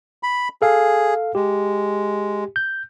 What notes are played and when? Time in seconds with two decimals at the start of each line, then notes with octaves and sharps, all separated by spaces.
0.23 B5
0.62 G#4 A4 F5
1.35 G#3 G4
2.56 G6